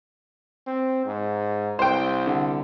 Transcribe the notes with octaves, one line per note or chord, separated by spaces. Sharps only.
C4
G#2
C2 C5 G5
D3